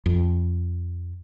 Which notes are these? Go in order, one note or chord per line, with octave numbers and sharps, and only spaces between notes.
F2